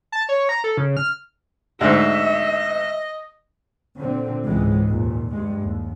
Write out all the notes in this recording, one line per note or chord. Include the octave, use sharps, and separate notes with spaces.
A5
C#5
A#5
A4
C#3
F6
D2 G#2 D#5 E5
A#2 D3 C4
C#2 G#2 E3 G#3
D#2 A#2
G2 G#3
D#2